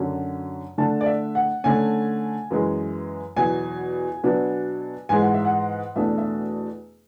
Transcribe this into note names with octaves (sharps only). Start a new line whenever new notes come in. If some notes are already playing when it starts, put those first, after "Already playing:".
Already playing: F#2 D3 F#3 C#4
D3 A3 D4 A5
D5
E5
F#5
D3 A3 C#4 G#5
F#2 E3 G#3
E2 B2 F#3 G#5
B2 F#3 B3 D4
G#2 E3 G#3 G#5
F#5
E5
F#5
E2 B2 A3 D4 E5
E5